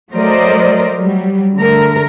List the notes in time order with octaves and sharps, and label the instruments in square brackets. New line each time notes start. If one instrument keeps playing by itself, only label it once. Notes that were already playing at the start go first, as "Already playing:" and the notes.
[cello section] F#3 A3 A#4 C5 D5 D#5
F#3 G3
D3 A3 A#4